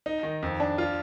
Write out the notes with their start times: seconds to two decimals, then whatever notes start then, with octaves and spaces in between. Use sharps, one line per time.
0.06 D#4
0.23 D#3
0.42 F2
0.60 D4
0.78 F4